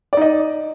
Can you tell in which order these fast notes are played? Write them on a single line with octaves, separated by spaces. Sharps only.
D5 D#4 D#5